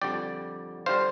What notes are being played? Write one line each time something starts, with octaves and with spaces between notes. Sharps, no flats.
F2 D3 G3 D5 G5
D3 G3 C5 F5